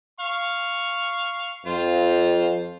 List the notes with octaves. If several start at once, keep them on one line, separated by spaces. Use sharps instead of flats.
F5 C#6
F2 F4 C5